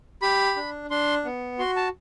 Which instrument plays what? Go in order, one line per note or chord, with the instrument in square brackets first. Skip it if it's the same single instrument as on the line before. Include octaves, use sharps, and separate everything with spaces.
[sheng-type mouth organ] G4 B5
D4
D4 C6
B3
F#4 C6
A5